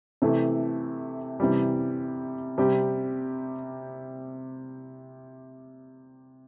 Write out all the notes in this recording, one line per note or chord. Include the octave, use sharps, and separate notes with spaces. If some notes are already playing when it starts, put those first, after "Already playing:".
C3 E3 A3
C3 E3 G3
C3 G3 C4 G4